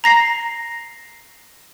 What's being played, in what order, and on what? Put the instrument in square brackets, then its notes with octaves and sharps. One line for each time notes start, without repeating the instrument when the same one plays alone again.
[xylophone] A#5 A#6 C7